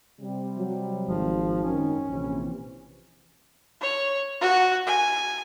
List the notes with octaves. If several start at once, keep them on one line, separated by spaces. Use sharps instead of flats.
C3 G3
F#3
G#1 F3
F#2 D#3 C#4
A#1 C3 E3
C#5
F#4
G#5